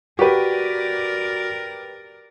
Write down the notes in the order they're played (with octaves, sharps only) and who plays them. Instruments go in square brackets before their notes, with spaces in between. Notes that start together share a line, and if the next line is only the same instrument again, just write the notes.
[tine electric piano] F#4 [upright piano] G4 B4 [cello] A#4 D5